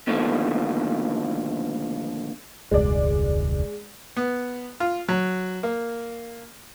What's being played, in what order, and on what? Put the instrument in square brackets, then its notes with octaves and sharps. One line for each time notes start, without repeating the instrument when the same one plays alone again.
[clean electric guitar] B2 D3 D#3 F3 A3 A#3
[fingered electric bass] E1 C#2 G2 [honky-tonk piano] G#3 D5
[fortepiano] B3
F4
F#3
A#3